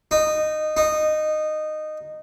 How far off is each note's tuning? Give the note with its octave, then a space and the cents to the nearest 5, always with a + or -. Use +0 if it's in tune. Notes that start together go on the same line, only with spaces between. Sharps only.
D#4 -15
D#4 -15